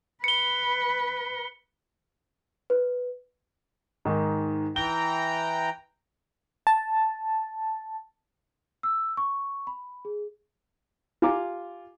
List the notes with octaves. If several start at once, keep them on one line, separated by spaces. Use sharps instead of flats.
B4 C#7 G7
B4
G#2 D#3
E3 G5 A#5 G7
A5
E6
C#6
B5
G#4
F4 G4 G#5 A#5 D6